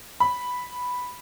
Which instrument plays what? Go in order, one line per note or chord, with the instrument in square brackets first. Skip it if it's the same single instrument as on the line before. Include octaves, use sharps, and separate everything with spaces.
[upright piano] B5